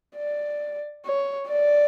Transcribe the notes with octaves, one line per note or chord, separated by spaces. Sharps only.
D5
C#5
D5